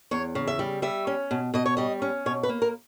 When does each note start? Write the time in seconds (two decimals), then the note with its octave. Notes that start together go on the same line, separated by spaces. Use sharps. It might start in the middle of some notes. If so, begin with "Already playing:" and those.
0.11 E2 C#5
0.35 C#3
0.47 E5
0.59 G3
0.82 G3 E5
1.07 C#4
1.31 B2
1.54 B2 D#5
1.66 C#5
1.77 G3 D#5
2.02 C#4
2.26 B2 C#5
2.43 B4
2.49 A#3
2.62 A#4